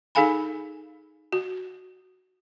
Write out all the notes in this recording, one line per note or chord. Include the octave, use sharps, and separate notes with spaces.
D#4 G#4 A4 F5 G#5 B5
F#4